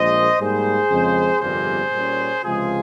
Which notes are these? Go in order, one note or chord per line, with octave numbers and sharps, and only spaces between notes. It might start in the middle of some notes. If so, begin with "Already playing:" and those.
Already playing: A#1 A#2 G#3 C5 D#5
G#2 G3 A#3 G#4 C5
F2 C#3 G#3
G1 F2 C3 G3 A#3 G#4 C5
A#2 G3 C#4
C#2 C3 F3 G#3 F4 G#4